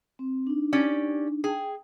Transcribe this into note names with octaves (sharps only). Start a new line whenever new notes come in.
C4
D4 D#4
C#4 G4 D5
G#4 G5